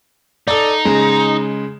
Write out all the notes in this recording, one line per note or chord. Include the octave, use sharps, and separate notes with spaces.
D#4 A4 D5
C#3 G#3